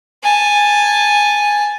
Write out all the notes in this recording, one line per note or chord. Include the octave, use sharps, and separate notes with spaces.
G#5 A5